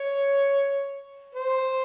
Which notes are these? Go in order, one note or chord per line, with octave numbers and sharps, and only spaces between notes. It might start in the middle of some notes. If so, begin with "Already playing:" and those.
Already playing: C#5
C5